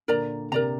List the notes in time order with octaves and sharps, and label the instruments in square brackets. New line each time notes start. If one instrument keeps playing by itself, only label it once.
[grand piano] A#2 D3 [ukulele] A#4 D5 A#5
[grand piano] C3 [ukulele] A#4 D5 A#5